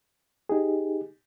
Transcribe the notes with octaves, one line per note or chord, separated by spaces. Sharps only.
D#4 G4 G#4